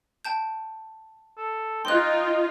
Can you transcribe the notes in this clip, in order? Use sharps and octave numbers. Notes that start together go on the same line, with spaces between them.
G5 A5 G6
A4
D#4 F4 G5 C6 F#6